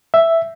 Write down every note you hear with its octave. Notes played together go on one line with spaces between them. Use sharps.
E5